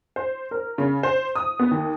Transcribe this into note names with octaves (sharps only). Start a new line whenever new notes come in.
C5
A#4
C#3
C5
D#6
B3
D#2